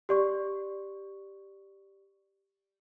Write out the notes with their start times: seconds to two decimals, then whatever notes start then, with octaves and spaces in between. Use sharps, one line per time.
0.09 G4 D5 C#6